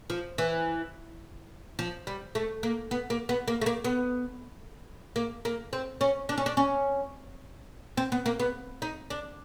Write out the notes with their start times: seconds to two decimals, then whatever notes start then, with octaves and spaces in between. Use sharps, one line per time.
0.10 F3
0.38 E3
1.79 F3
2.07 G3
2.35 A3
2.63 A#3
2.91 B3
3.10 A#3
3.29 B3
3.48 A#3
3.61 A3
3.66 A#3
3.84 B3
5.16 A#3
5.45 A#3
5.73 C4
6.01 C#4
6.29 D4
6.38 C#4
6.46 D4
6.57 C#4
7.97 C4
8.12 B3
8.26 A#3
8.40 B3
8.82 D#4
9.10 D4